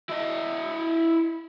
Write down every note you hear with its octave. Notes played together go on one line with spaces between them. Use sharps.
E4 D#5